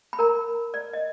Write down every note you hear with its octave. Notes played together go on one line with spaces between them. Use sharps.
B5
A#4 A#5
D5
D#5